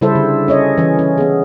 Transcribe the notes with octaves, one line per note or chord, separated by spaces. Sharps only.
C#3 G3 E4 A4 C5 E5
D3
C#4 C#5 D#5
E3 C#4
C#4
B3 G#4